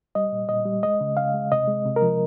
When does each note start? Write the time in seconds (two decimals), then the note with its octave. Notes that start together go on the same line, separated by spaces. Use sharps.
0.15 G3 D#5
0.32 A#2
0.49 A#2 D#5
0.65 G3
0.83 G#3 D#5
1.01 C#3
1.17 C#3 F5
1.34 G#3
1.52 C3 D#5
1.68 G#3
1.85 C3
1.96 A#4
2.02 F3